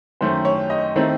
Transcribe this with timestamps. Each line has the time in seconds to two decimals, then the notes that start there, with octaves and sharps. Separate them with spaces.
0.21 F#2 D#3 A3 C#4 C5
0.45 C#5
0.70 D#5
0.96 D#3 A3 C4 D#4